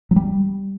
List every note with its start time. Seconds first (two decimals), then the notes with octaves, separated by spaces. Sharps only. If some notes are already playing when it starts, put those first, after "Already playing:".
0.11 F#3
0.16 G3